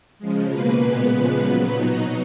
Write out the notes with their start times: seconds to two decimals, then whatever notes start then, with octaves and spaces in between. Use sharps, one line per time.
0.18 C#3 F3 G#3
0.49 B2 A#3 B4
0.80 A#2 G#3 B3
1.11 C#3 F3 G#3 B3
1.42 A#2 F#3 B3
1.72 B2 F#3 B3 D#4